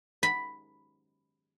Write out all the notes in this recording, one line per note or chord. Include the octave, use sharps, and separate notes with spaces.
B5